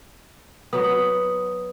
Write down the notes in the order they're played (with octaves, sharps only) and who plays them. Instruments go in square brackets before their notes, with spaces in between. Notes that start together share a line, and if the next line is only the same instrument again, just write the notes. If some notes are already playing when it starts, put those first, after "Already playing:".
[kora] F#3 B3 [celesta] D#6